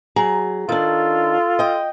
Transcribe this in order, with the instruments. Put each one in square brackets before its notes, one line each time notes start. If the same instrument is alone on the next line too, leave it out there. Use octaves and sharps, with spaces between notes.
[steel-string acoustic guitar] F#3 G#4 A#5
[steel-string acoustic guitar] D#3 D4 [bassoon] F4 [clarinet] A4
[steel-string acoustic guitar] D#5 G5